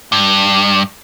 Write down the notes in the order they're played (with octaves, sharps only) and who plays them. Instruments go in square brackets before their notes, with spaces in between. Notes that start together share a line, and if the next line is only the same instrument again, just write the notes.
[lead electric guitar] G2